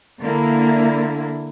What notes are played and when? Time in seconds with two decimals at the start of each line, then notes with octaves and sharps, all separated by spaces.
0.21 D3 A#3 E4